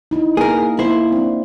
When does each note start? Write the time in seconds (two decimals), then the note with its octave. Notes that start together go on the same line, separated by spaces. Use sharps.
0.11 D#4 E4
0.37 A#3 G#4 A#4 B4
0.79 A#3 E4 C5
1.12 C4 D4